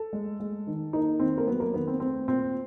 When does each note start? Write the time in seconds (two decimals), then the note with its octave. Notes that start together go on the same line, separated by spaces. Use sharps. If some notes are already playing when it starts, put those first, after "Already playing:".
Already playing: A4
0.13 G#3
0.40 G#3
0.67 D#3
0.93 A#3 D#4
1.19 D#3 C4
1.38 A#3
1.47 F#3 B3
1.60 A#3
1.74 D#3 B3
1.87 C4
2.00 A3 C4
2.28 A#2 C4